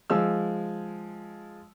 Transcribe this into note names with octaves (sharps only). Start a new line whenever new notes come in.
F3 G#3 E6